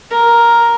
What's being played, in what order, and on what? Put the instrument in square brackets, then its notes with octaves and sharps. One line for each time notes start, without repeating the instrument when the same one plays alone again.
[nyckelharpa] A#4